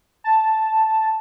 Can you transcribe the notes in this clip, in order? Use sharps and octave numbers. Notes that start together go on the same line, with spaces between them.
A5